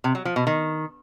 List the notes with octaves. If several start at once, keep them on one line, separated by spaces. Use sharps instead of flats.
C3
F#3
F3
B2
D#3